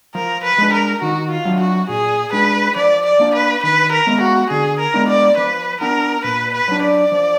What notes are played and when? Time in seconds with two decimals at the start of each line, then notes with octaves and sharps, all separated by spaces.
0.15 F3 A#4
0.44 B4
0.58 G#3 D4
0.73 A#4
1.02 D#3 F#4
1.31 F4
1.45 F#3 D4
1.60 F#4
1.89 A#2 G#4
2.32 G#3 D4 B4
2.76 F3 D5
3.05 D5
3.19 A#3 D4
3.34 B4
3.63 D#3 B4
3.92 A#4
4.07 G#3 B3
4.21 F#4
4.50 D3 G#4
4.80 A#4
4.94 G#3 B3 D4
5.08 D5
5.37 F3 B4
5.81 B3 D4 A#4
6.24 A#2 B4
6.53 B4
6.68 F#3 D4
6.82 D5
7.12 F3